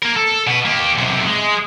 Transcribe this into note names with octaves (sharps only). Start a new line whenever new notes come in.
A#3 A#4
A4
B2 B4
A#3 G4
B1 C3
G#3